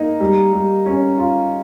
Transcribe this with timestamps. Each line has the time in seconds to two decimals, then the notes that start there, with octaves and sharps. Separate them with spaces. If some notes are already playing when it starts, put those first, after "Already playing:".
Already playing: A#3 D#4
0.20 G3
0.53 G3
0.86 C#4
1.18 F4